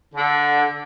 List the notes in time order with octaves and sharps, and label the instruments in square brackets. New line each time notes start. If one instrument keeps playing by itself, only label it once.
[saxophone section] D3